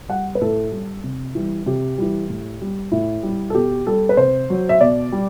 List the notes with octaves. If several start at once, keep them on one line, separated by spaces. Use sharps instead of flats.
G3 F#5
B4
A2 A4
G3
C3
E3 G3
C3 G4
E3 G3
A2
G3
A2 E4
G3
A4
B2 G4
G3 A4
B4
C3 C5
F#3
E5
B2 D5
G3